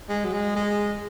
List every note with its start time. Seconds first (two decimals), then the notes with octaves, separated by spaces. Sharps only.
0.09 G#3
0.25 F#3
0.33 G#3
0.56 G#3